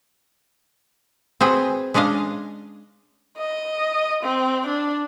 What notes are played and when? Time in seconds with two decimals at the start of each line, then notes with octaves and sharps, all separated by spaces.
1.41 C4 F#4 G#4 B4
1.94 G#3 C#4 D4 D#5 F5
3.37 D#5
4.23 C4
4.67 D4